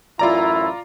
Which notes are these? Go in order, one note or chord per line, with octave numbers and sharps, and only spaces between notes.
A1 F#2 E4 F4 D5 A#5